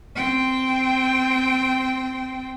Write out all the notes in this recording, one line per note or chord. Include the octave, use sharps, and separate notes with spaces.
C4 G5